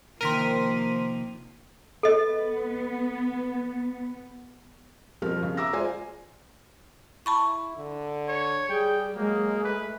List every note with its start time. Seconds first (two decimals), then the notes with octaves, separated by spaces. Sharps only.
0.21 C3 D#3 F3 A#3 A#4 C6 B6 D#7
2.03 B3 A4 D#5
5.22 F2 B2 F3 G3 A#4 F6
5.43 C#3
5.57 E5 A#5 D6 E6 A#6
5.72 G#3 F4 G#4 C5 D5 G#5
7.26 E4 A5 B5 C#6
7.77 D3
8.29 C#5
8.69 G3 G#4 G5
9.16 F#3 G#3 A#3
9.64 A3 B4